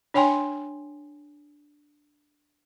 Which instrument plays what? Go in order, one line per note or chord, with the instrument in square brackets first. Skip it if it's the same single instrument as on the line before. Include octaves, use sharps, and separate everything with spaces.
[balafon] D4 C#5 G5 G#5 C6